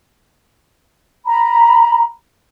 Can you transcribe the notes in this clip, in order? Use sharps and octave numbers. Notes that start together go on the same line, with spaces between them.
A#5 B5